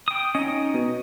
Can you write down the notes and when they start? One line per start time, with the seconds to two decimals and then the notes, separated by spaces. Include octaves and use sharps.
0.08 G5 D#6
0.35 C#4 D#4 D#5
0.74 B2